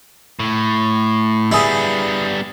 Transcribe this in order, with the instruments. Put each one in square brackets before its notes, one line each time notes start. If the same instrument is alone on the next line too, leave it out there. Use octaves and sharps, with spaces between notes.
[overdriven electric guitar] A2
[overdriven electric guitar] G3 B3 [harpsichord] E4 G#4